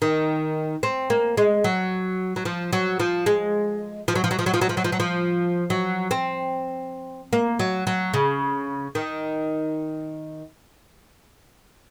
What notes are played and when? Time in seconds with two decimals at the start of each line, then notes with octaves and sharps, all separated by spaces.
0.02 D#3
0.83 C4
1.10 A#3
1.37 G#3
1.64 F#3
2.36 F#3
2.45 F3
2.73 F#3
3.00 F3
3.26 G#3
4.08 F3
4.15 F#3
4.24 F3
4.31 F#3
4.39 F3
4.46 F#3
4.54 F3
4.61 F#3
4.69 F3
4.77 F#3
4.84 F3
4.92 F#3
5.00 F3
5.70 F#3
6.11 C4
7.33 A#3
7.59 F#3
7.87 F#3
8.14 C#3
8.95 D#3